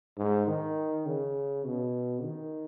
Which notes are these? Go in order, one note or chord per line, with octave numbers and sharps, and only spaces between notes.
G#2
D#3
C#3
B2
D#3